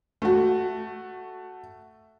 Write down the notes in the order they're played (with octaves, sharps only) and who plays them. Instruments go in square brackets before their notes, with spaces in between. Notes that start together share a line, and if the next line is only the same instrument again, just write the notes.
[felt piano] A3 F#4